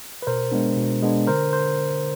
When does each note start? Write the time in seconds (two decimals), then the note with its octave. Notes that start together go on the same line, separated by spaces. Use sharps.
0.22 B4
0.27 B2 A#4 C5
0.51 G#3 B3 D4
0.77 B2
1.02 G#3 B3 D4
1.27 D3 A#4 C5
1.53 C5